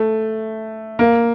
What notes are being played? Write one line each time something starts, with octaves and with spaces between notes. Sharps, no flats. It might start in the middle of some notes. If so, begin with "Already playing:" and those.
Already playing: A3
A#3